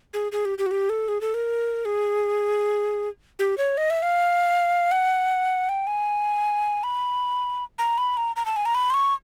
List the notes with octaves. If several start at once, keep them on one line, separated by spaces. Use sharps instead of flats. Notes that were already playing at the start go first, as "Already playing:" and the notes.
G#4
G#4
G4
G4
F#4
G4
A4
G#4
A4
A#4
G#4
G4
C#5
D#5
E5
F5
F#5
G5
G#5
B5
A#5
B5
A#5
A#5
A5
G#5
A#5
B5
C6
C#6